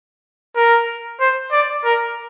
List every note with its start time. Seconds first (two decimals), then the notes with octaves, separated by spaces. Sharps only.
0.56 A#4
1.20 C5
1.52 D5
1.85 A#4